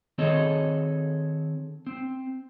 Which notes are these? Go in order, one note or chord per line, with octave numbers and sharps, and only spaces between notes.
D#3 C4 G#4 A4 C#5 D#5
C4